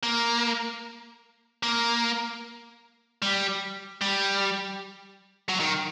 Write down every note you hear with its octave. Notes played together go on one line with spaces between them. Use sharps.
A#3
A#3
G3
G3
F#3
D#3